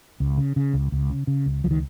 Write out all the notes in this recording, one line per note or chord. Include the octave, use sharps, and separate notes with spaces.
C#2
C#3
C#3
C#2
C#2
C#3
C#3
C#2
C#2 F3
D#3